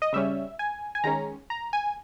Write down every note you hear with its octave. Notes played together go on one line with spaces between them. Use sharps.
D#5
C#3 G3 C#4 E5
G#5
G#5
D#3 G#3 C#4 A#5
A#5
G#5